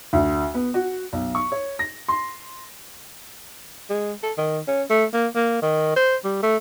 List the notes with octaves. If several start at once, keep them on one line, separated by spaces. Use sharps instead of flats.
D2
B3
F#4
B1
C#6
C#5
A#6
C6
G#3
A4
D#3
C#4
A3
A#3
A#3
D#3
C5
G3
A3